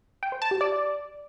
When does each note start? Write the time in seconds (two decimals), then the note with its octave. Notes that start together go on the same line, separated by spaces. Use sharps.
0.23 G5
0.32 C5
0.42 A5
0.51 G4
0.61 D5